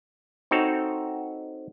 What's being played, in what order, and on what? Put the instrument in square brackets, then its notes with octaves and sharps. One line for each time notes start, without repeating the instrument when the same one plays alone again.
[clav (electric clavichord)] C4 D#4 F#4 A4 C#5